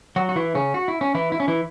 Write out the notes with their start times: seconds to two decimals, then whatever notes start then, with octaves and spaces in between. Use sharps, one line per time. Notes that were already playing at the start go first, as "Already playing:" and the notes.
0.16 F#3 F#4
0.29 F#4
0.36 E3 E4
0.55 C#3 C#4
0.74 F#4
0.88 E4
1.01 C#4
1.15 E3 E4
1.32 E4
1.40 C#4
1.48 E3 E4